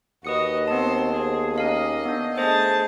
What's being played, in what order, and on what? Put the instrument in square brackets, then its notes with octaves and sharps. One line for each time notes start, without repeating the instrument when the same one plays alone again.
[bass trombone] D#2 [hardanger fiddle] F#4 D#5 [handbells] B4 D#6 C#7
[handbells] B3 A5 [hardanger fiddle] C4 C5
[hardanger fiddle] G#4
[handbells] C#4 A#4 F5 [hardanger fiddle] D#5
[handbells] B3 D4
[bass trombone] A3 [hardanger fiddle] G#4 A5 [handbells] C5 D#5 D#6